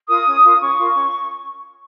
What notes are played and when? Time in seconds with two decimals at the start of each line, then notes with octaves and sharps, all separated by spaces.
0.08 F4 A#4 D#6
0.25 C#4
0.43 F4 A#4
0.60 C#4 C#6
0.77 F4 A#4
0.94 C#4